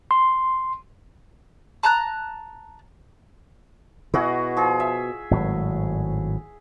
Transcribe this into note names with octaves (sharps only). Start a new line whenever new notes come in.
C6
A5 A#5 F#6
B2 E4 F#4 G#4
F3 G#4
E5
G#1 A2 F#3